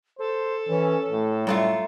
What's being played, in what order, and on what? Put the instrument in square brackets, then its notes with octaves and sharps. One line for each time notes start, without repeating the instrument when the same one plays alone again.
[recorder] A4 [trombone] C5
[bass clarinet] E3 [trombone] C#4
[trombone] A2 [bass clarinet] A3
[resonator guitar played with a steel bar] F#2 A3 F4 [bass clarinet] G3